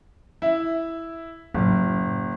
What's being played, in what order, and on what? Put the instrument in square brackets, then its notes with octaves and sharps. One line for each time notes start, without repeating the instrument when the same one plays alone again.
[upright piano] E4 E5
[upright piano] F#1 [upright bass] A2 F4